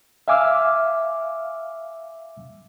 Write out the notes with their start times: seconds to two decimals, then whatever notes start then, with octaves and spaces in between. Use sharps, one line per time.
0.28 E5 F5 G#5 D6 E6 F6